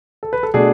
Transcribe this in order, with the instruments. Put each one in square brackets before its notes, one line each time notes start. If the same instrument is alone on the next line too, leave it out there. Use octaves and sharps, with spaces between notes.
[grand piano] A4
B4
A4
B2 A3 D4 G#4